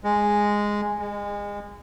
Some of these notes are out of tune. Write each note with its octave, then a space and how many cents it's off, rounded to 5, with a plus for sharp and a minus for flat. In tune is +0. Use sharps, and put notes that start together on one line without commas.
G#3 -5
G#3 -30